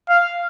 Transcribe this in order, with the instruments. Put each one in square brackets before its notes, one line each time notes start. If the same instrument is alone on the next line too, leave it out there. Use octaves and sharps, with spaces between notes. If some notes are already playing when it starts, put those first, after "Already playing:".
[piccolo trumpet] F5